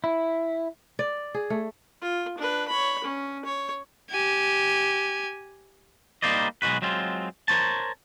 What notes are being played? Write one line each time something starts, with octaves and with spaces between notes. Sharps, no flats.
E4
D5
G#4
A3
F4
D4 B4
C#5 B5
C#4
C#5
G4 G#5
G3 A#3 D#4 C5 D5 D#5
B1 G#3 F#4 B4
F#3 G#3 C4 F4
A#4 C5 C#5 A5